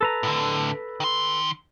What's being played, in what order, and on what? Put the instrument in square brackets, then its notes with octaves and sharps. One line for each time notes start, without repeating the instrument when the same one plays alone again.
[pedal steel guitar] A4 B4 A#5
[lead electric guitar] A2 D3
D#3 C6